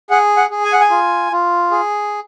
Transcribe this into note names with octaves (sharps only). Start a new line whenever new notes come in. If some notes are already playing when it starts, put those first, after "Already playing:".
G#4 F#5
F#5
G#4
G#5
F#5
G#5
F4
F4
G#4